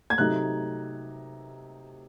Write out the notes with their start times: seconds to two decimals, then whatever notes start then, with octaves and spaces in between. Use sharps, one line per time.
0.10 G#6
0.18 C3 F#3 A3 D#4 F#6